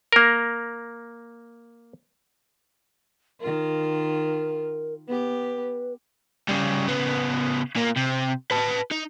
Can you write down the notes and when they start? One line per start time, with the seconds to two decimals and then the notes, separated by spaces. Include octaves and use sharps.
0.12 A#3 A#4
3.41 D#3 F4 A#4
5.08 B3 G4 B4
6.48 G2 C#3
6.88 C#3 B3
7.76 A#2 A#3
7.97 C3
8.51 B4 A5
8.92 D#4